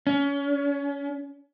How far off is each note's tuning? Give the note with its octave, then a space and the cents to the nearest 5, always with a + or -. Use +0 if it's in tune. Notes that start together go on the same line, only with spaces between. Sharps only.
C#4 +30